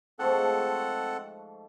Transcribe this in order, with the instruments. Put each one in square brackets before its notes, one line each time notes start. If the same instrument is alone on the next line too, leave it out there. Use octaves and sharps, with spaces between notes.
[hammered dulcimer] G#2 F3 A3 [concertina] C4 A4 F#5